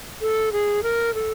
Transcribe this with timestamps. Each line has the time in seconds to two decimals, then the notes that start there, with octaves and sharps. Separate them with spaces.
0.21 A4
0.52 G#4
0.83 A#4
1.14 A4